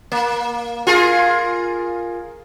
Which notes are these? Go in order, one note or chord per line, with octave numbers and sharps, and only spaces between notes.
A#3
F4 G#4 A#4